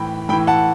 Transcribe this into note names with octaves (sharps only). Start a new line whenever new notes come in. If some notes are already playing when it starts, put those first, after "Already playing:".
Already playing: A2 E3 G5 B5
A2 E3 G5 B5
F#5 A5